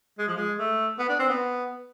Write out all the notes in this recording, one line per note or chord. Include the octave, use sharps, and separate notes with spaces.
G#3
F3
G#3
A3
B3
D4
C4
B3